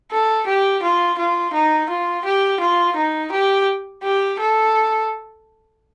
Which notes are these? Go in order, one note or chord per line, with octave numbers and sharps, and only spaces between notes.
A4
G4
F4
F4
D#4
F4
G4
F4
D#4
G4
G4
A4